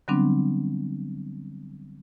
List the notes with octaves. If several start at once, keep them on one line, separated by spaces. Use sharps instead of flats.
D3 F#3 G3 B3 C4 D4